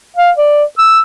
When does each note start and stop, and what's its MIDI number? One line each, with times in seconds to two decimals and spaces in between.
0.16 0.31 77
0.38 0.64 74
0.78 1.00 88